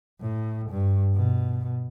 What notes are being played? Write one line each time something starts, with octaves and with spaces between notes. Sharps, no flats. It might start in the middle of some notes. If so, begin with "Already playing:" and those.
A2
G2
B2